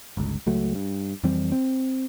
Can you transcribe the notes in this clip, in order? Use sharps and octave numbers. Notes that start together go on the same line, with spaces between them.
G1 C#2
C#2 F#3 A3
G2
F2 E3 G3 C4
C4